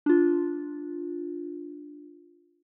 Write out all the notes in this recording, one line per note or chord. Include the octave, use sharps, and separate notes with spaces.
D4 F4